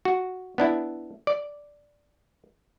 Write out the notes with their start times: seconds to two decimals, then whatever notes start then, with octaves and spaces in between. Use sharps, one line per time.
0.05 F#4
0.58 B3 D4 E4
1.27 D5